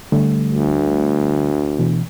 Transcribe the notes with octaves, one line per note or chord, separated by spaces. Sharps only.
D3 G3 A3
D2
B2 E3